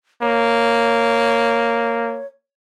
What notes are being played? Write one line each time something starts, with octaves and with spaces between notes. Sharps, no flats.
A#3 C#5